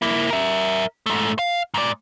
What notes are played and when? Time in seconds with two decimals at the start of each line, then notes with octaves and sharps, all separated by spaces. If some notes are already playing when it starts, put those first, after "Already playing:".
0.02 A#3 E4
0.30 A#4 E5
1.06 G#2 A3
1.39 F5
1.74 G#2 D5